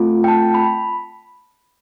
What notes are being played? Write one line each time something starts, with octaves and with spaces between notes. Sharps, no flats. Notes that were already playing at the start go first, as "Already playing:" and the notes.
Already playing: A3 C4 F4 A4
G5
A5
B5